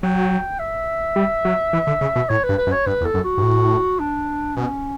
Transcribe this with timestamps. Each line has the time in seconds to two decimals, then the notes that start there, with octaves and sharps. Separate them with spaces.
0.03 F#3 G5
0.59 E5
1.16 G3
1.45 F#3
1.73 E3
1.87 D3
2.01 C#3
2.16 B2
2.29 A2 C#5
2.44 B4
2.49 G2
2.58 B4
2.67 F#2
2.72 C#5
2.87 G2 B4
3.01 E2
3.05 A4
3.14 F#2
3.24 F#4
3.37 G2
3.43 A2
4.00 D4
4.56 B2 C#4